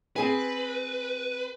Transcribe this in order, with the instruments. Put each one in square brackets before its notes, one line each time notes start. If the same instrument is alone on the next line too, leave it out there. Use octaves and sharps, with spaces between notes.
[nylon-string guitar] C4 G#4 G#5 [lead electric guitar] B4